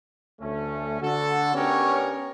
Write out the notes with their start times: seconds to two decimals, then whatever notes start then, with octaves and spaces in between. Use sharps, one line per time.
0.41 D2 A3 C#4
1.02 D3 F#4 A4
1.55 B3 C#4 D4 G4 A#4 C#5